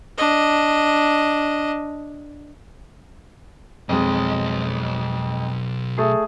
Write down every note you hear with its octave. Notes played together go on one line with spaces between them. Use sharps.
D4 D#5
B1 F2 G#3 D#5
A3 G#4